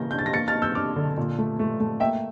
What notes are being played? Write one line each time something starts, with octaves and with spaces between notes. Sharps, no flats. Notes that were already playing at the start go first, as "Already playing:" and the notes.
Already playing: C#3 E3 A#3 G6 A#6
D4 G6
A6
A#6
A#3 A6 C#7
F6 A6
A#3
E6 G6
D4 D6 F6
D3
A#2
A3
A3
A3
A#3 E5 G5